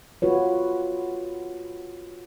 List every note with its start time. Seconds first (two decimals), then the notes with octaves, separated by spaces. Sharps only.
0.22 F4 F#4 B4 C#5